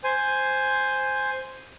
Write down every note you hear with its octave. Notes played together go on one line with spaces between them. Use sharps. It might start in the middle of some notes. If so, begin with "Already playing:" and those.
C5 G#5